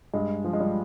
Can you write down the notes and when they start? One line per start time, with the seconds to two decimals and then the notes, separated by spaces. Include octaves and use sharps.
0.14 G2 G#3
0.44 F3
0.53 G#3
0.60 G3